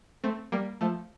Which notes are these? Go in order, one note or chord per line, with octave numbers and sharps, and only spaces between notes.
A3 C4
G3 A#3
F3 A3